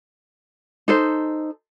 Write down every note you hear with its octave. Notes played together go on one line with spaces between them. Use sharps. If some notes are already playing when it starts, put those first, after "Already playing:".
D#4 A4 C5